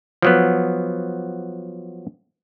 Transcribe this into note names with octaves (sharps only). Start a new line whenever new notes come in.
F3 F#3 B3